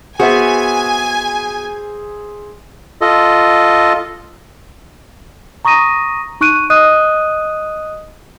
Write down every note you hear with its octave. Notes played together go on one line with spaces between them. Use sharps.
B3 F#4 G#4 C5 E5 G#5
F4 A4 D#5
A#5 C#6 D#6 A#6 D#7
D#4 C#6 F#6 D7 D#7
D#5 D#6 F#6 D#7